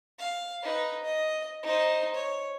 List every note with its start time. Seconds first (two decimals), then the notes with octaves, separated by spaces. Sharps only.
0.19 F5
0.63 D#4 B4
1.04 D#5
1.63 D#4 C5
2.14 C#5